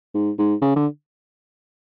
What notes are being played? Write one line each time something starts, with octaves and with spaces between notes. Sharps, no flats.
G#2
G#2
C#3
D3